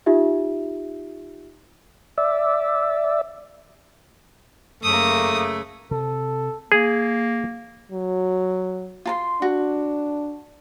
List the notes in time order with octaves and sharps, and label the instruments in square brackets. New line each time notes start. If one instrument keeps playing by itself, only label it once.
[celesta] D#4 F4 G4 E5
[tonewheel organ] D5 E5
[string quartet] F#2 A#3 [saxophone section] C#3 A3 [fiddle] D#6
[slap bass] C3 [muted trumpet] A4
[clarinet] A#3 [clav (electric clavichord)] G#4
[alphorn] F#3
[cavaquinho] F4 A5 C6
[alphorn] D4 [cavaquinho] F#4